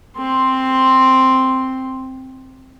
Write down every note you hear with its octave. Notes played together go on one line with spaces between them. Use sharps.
C4 C6